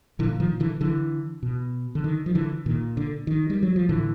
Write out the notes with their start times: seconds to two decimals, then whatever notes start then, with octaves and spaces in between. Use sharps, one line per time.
0.19 A#2 D3 E3
0.40 D#3 F3
0.60 D3 E3
0.81 D3 E3
1.43 B2
1.95 D3
2.04 D#3
2.26 F3
2.35 D3 E3
2.66 A#2 D#3
2.97 D3
3.27 D#3
3.50 G3
3.63 F#3
3.76 F3
3.89 A2 D3 E3